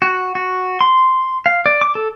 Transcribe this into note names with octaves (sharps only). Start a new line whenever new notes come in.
F#4
F#4
C6
F5
D5
D6
A4